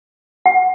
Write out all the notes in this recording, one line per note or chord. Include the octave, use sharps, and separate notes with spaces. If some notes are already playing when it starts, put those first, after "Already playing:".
F#5